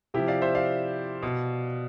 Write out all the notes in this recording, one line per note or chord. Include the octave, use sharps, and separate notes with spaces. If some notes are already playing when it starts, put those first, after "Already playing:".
C3 F3 E4 G4
D5 F5
C5 E5
D5 F5
B2